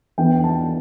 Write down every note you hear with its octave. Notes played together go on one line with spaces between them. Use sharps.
E2 E3 B3 D4 G5
A5